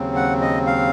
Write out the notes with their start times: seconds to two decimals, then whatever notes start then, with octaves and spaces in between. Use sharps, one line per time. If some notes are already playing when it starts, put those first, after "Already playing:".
Already playing: D#2 C#3 F#3 C4
0.16 F#5
0.41 D#5
0.67 F5